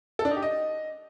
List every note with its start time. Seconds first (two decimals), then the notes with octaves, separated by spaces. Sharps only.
0.19 A4
0.25 D4
0.31 D#4
0.37 G4
0.42 D#5